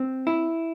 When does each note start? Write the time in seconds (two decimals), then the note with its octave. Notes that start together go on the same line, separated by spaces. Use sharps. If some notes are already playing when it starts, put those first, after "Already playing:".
Already playing: C4
0.27 E4